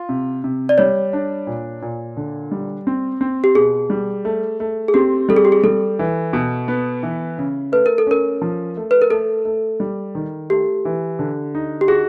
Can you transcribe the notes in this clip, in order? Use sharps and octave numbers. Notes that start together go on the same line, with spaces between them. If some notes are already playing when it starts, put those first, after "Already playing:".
Already playing: F4
C3
C3
D5
G3 C#5
D4
A#2
A#2
D3
G3
C4
C4
G4
B2 G#4
G3
A3
A3
G#4
C4 G4
G3 A4
G#4
G4
G#4
G3 A4
E3
B2
B3
E3
C#3
A3 B4
A#4
A4
C#4 A#4
F3
A3
B4
A#4
A3 A4
A3
G3
D#3
A3 G4
E3
D3
D#4
G4
F#4 G#4